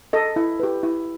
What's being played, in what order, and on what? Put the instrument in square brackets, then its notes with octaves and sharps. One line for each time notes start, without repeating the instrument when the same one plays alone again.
[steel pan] A4 D#5
E4
G4 B4
E4